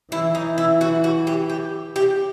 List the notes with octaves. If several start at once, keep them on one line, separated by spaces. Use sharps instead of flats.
E3 E4
D#4
E4
F#4
F#4
G4
G4
G4